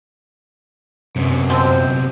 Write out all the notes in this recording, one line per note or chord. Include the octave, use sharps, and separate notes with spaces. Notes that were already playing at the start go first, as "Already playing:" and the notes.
F#2 C3 B3
F3 G#3 C4